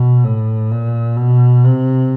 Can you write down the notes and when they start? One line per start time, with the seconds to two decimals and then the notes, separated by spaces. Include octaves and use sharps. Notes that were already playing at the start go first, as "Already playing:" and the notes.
Already playing: B2
0.24 A2
0.71 A#2
1.17 B2
1.64 C3